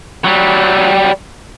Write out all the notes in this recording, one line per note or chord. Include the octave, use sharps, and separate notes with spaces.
F#3 G3